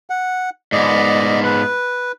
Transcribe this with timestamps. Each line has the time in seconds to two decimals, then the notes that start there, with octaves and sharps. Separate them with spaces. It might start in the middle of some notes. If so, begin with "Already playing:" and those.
0.10 F#5
0.72 G#2 B3 D5 D#5
1.44 B4